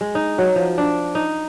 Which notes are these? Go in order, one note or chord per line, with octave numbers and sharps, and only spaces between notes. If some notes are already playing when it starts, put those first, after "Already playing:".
G#3
D#4
F#3
F3
D4
D#4